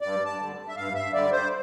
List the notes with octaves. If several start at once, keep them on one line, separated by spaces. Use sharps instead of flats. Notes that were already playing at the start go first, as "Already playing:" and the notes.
G2 D5
A5
D3 G3
E5
G2 F5
E5
D3 G3 D5
C5